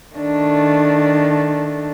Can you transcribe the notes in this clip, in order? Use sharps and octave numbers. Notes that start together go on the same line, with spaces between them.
D#3 A3 D4